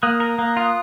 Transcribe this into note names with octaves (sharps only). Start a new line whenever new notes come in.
A#3 D#6 F#6
A#4
A#3
F4